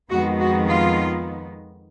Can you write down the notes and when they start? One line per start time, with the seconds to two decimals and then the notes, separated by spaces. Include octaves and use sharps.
0.11 F2 D#3 G#3 B3 F#4
0.40 F#4
0.68 F4